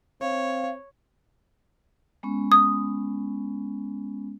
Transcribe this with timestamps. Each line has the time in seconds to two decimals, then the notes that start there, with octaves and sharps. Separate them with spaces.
0.21 C4 C#5 F5
2.23 G#3 B3 C#4
2.52 D#6